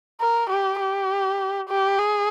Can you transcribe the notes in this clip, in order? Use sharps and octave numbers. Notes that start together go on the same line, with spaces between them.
A#4
G4
G4
G4
G#4